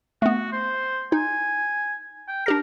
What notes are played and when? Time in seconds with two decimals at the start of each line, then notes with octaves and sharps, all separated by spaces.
0.22 A3 B3 F#4
0.52 C5
1.12 D#4 G#5
2.28 G5
2.46 D4 G4 A#4 A#6